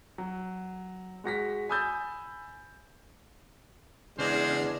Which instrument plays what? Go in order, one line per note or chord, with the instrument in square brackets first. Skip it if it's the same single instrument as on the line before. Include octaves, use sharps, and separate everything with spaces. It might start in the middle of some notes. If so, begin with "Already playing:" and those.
[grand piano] F#3
G#3 F#4 A#6 B6
G#5 B5 D#6 E6 G6 A6
[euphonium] E2 [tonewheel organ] C#3 F6 [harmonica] G#3 D4 [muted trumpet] C5